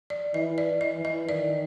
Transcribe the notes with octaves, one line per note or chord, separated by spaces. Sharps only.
D5
E3 D#5
D5
D#5
E3
D#5
D#3 D5